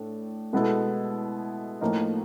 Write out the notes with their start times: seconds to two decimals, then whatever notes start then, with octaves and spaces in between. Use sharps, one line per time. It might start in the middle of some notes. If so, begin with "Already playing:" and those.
Already playing: A2 A3 D4
0.53 B2 G#3 B3 E4 A4
1.81 A2 F3 A#3 D#4